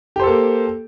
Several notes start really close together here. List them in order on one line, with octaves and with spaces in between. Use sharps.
G4 C5 A4 A#3